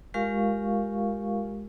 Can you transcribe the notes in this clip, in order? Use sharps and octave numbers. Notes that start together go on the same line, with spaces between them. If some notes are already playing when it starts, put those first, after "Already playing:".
G#3 F4 G4 A#4 F5 C#6